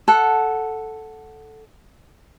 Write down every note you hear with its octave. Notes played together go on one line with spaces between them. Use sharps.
A4 F#5